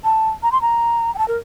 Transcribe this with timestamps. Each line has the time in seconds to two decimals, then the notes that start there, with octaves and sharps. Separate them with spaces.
0.04 A5
0.43 A#5
0.52 C6
0.62 A#5
1.15 G5
1.18 A5
1.28 A#4